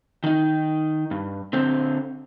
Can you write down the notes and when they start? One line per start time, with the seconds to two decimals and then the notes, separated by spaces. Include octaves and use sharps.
0.24 D#3 D#4
1.11 G2
1.53 D3 C4 C5